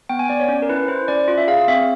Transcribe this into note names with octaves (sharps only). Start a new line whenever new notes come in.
B3 G5
G#5
B3 D5
C#5
C#4
A#4
E4 B4
E4 C5
C#4 D5
F4
E5
G#4 F5
F5
C4 E5